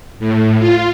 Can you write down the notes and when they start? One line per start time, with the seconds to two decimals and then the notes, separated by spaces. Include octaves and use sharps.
0.19 A2
0.59 F4